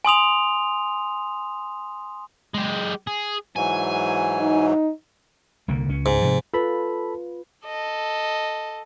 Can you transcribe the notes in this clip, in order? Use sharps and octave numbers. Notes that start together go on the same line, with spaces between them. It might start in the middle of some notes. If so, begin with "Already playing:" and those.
G#5 C6 D#6 F7
G#3 G4
G#4
G#2 E3 F#3 G#5
D#4
C2 D3 A#3
C#2 C#4
G#2
C3 F3
F4 A4 B4 A5 B5
A4 D#5